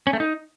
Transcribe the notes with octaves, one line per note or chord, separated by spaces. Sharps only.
C#4
A3
D#4